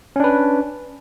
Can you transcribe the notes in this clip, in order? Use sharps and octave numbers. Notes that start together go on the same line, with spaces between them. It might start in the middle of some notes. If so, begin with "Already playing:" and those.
C#4 D4 B4